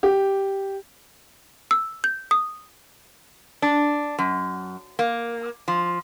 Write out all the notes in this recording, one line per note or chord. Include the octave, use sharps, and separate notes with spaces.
G4
E6
G6
D#6
D4
F#2
A#3
F3